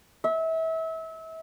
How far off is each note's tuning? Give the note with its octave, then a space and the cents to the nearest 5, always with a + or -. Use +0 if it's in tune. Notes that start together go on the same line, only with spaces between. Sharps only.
E5 -30